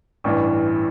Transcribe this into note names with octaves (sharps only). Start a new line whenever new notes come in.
A1 G2 E3